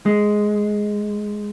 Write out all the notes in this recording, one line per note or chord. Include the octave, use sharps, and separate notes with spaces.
G#3